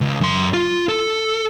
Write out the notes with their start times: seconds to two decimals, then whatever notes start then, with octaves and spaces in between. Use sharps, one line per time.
0.01 C#2
0.21 F#2 C6
0.54 F4
0.89 A4